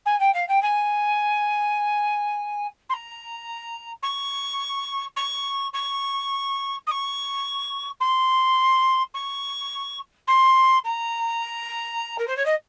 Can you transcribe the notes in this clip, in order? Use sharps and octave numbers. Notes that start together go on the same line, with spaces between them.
G#5
G5
F5
G5
G#5
C6
A#5
C#6
C#6
C#6
D#6
C#6
C6
C#6
C6
A#5
A#4
C5
C#5
D#5